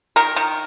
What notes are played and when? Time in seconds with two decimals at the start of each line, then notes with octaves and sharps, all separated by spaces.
0.16 D#3 A#4
0.36 D#3